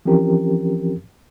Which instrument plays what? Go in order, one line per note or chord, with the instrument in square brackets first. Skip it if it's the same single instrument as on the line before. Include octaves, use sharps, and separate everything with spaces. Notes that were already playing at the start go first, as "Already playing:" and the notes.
[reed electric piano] E3 F3 C4 C#4 G4 A#4